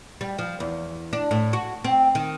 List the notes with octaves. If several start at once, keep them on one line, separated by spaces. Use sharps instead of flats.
G3
F3
E2
D4
A2
F#4
C4
D#3